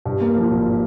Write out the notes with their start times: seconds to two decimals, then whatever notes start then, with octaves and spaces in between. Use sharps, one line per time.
0.05 G2
0.21 A#3
0.36 F3
0.51 G#1